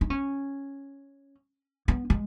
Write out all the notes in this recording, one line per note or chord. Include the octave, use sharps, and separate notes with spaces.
D#4
C#4
B3
G#3